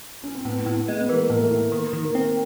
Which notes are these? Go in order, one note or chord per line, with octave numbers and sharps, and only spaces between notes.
C#4
C4
A2 B3
A2
B3
G#3
B3
E3 A#3
A2 A#3
A3
A2
D#3 A#3
D#3
A#3
C4